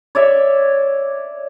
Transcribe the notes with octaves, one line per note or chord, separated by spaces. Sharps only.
C#5 D5 E5